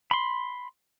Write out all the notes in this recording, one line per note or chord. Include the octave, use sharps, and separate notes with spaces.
B5 C6